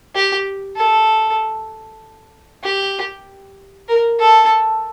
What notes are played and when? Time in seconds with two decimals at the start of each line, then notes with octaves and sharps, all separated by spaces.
0.15 G4
0.77 A4
2.64 G4
3.89 A#4
4.20 A4